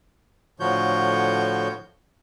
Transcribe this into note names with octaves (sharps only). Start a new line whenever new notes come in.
A2 D3 F3 F#4 C#5 G6